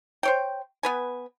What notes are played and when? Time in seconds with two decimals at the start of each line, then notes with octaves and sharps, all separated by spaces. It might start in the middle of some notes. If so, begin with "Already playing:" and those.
0.23 C5 C#5 G5
0.83 B3 B4 G#5